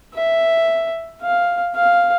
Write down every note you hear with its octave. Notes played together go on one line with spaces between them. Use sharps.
E5
F5
F5